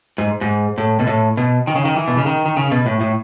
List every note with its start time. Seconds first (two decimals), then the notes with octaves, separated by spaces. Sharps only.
0.18 G#2
0.41 G#2
0.78 A2
0.99 B2
1.07 A2
1.37 B2
1.67 D#3
1.76 C#3
1.85 D#3
1.96 E3
2.08 B2
2.17 C#3
2.26 D#3
2.46 D#3
2.57 C#3
2.71 B2
2.86 A2
3.01 A2